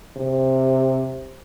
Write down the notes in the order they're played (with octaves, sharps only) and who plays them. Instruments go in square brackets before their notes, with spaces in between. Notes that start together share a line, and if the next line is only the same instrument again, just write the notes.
[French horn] C3